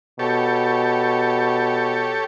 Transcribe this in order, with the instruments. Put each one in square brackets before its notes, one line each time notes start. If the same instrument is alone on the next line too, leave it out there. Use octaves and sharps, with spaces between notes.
[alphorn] B2 [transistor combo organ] G4 A4 C#5